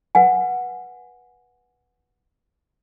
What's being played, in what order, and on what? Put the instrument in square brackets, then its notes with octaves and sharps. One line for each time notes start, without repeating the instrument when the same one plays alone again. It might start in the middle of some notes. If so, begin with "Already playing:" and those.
[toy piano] B4 F#5 G#5